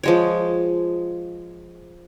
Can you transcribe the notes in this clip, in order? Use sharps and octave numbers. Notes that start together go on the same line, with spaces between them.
F3 G#3 C#5